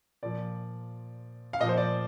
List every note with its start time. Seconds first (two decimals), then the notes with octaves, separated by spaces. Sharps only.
0.23 A#2 F3 D5
1.53 F5
1.60 A#2 D#5
1.64 F3 C5
1.78 D5